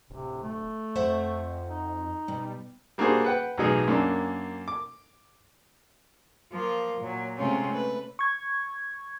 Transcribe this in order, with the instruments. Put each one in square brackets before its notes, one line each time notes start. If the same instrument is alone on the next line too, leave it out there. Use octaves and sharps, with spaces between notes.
[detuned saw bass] D1 [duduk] C3
[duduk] A3
[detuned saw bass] F2 [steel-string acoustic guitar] C5 E5 F#5
[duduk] D#4
[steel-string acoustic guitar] B2 [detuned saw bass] G3
[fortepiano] G3 A#3 D4 F#4 G#4 C5
B4 F#5 G5
B1 A2 E3 F#3 D#4 G#4
F#2 A#3 C#4 D4
D6
[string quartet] F3 A#3 F4
A#2 F#3
C3 G#3 A3 C4 C#4 F4
A3 B4
[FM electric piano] C#6 G#6